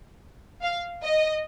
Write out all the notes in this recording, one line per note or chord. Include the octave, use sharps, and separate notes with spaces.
F5
D#5